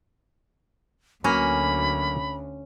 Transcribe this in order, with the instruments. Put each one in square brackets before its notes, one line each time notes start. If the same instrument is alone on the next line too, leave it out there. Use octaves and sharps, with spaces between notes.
[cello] D2 [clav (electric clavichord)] F#3 A#3 B4 [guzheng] C#4 [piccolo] B5